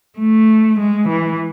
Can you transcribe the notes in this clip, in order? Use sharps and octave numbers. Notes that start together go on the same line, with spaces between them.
A3
G#3
E3